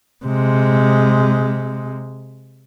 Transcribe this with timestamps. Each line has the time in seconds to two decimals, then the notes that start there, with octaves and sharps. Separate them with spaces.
0.25 C3 G#3